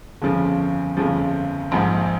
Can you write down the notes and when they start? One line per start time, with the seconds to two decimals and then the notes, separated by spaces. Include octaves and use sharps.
0.22 G1 F2 C#3 F3
0.97 G1 F2 C#3 F3
1.71 A#1 G#2 F3 C4